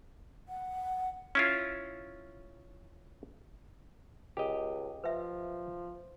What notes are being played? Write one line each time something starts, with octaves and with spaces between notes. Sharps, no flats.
F#5
C#4 E4 F4
C#2 G4 D#5
F3 B4 E5